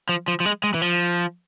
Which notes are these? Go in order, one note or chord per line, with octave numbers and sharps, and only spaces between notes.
F3
F3
F3
G#3
G#3
E3
F3